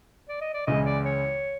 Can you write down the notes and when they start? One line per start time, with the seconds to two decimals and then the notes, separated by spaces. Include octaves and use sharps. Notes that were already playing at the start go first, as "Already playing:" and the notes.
0.29 D5
0.41 D#5
0.54 D5
0.67 C#2 C#3 E3 G#3 D#5
0.86 D5
1.05 C#5